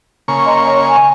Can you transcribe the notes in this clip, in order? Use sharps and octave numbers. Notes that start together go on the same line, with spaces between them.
C#3 A#3 C#6
D#5 A#5 C6
C#5 D#5
G#5